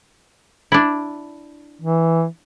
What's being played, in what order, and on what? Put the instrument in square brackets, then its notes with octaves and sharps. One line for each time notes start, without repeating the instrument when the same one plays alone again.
[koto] D4 E4
[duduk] E3